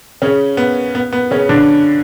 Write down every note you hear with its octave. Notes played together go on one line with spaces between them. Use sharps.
C#3 C#4
B3
B3
B3
C#3 C#4
D3 D4